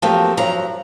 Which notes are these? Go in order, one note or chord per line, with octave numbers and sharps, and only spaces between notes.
F3 F#3 A3 A#3 C4 G4
G2 F3 F#3 A#5